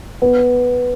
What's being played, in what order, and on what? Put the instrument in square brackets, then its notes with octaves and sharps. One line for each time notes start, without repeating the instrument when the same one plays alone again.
[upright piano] B3